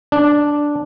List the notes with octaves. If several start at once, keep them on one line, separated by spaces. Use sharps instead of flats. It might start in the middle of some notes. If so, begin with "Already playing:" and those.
D4